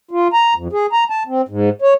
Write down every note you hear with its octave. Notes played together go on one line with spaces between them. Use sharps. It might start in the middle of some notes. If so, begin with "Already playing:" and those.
F4
A#5
F2
G#4
A#5
A5
C4
G#2
C#5